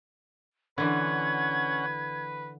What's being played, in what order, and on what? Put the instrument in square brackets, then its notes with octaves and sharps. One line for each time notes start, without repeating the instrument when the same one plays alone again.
[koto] D3 E3 [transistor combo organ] C#4 F#5 [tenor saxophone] B4 [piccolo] G#6